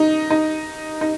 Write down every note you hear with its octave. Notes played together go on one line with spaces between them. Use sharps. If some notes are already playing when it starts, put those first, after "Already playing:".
Already playing: D#4
D#4
D#4